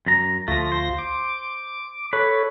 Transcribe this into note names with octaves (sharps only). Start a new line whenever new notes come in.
F#2 A#5
D2 F3 A3 F4 A#6
C5
D6
A4 B4 C#5